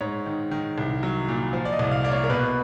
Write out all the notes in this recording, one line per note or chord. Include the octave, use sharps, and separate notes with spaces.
G#2 C#5
D#3
D#3
C2
F#3
A#2
F3
D5
D#5
C2
F5
A#3 D5
C#5
A#4
B2 B4